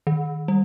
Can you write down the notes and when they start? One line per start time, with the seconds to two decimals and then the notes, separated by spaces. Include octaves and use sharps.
0.07 D#3
0.48 G3